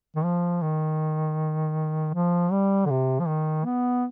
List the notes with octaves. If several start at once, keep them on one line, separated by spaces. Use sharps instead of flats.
D#3
F3
D#3
F3
G3
D3
C3
F3
D#3
B3